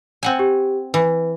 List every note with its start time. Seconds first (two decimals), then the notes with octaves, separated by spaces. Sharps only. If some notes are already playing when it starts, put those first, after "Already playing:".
0.23 C4 F#5 G#5
0.39 G4
0.94 E3 B4